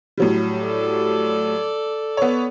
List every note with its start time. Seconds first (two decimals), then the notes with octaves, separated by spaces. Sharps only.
0.18 A2 F#3 G3
0.62 A4 D5
2.17 B3 C#5